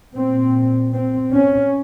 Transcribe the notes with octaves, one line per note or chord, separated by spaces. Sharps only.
A#2 C4
C4
C#4